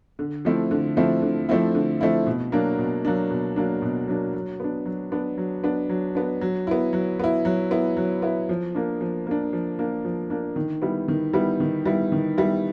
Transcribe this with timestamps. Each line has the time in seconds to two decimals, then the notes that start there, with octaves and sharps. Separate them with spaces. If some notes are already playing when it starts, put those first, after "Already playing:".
0.19 D3
0.45 F3 A3 C4 E4
0.71 D3
0.97 F3 A3 C4 E4
1.22 D3
1.49 F3 A3 C4 E4
1.75 D3
2.01 F3 A3 C4 E4
2.27 B2
2.52 F#3 A#3 D4
2.79 B2
3.05 F#3 A#3 D4
3.31 B2
3.56 F#3 A#3 D4
3.82 B2
4.08 F#3 A#3 D4
4.33 F#3
4.60 B3 D4
4.86 F#3
5.12 B3 D4
5.38 F#3
5.64 B3 D4
5.90 F#3
6.15 B3 D4
6.41 F#3
6.67 B3 E4
6.93 F#3
7.20 B3 E4
7.45 F#3
7.71 B3 E4
7.97 F#3
8.22 B3 E4
8.49 F3
8.75 A#3 D4
9.01 F3
9.27 A#3 D4
9.53 F3
9.79 A#3 D4
10.05 F3
10.30 A#3 D4
10.56 D#3
10.82 G3 B3 E4
11.08 D#3
11.34 G3 B3 E4
11.60 D#3
11.85 G3 B3 E4
12.12 D#3
12.37 G3 B3 E4